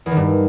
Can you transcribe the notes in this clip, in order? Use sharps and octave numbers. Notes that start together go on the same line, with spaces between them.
E2
D#3
G2